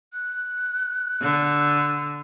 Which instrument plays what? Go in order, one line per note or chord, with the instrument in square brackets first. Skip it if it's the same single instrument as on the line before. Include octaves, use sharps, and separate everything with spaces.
[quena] F#6
[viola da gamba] D3